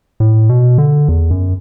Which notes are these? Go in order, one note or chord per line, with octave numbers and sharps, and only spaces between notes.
A2
B2
D3
E2
F#2